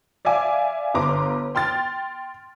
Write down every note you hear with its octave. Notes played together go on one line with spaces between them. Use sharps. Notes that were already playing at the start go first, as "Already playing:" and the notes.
D5 E5 F5 G#5 D6
G1 A#5 C6 D6
G5 C6 F6 A6